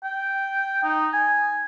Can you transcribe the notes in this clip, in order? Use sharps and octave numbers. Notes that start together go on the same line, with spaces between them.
G5
D#4
G#5